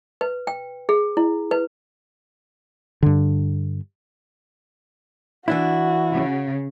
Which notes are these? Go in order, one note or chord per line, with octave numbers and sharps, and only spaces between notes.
B4
G5
G#4
E4
B4
G2 D3
E3 D4 E4 F#4
C#3